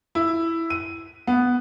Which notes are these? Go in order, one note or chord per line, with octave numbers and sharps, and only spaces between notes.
E4
D#7
B3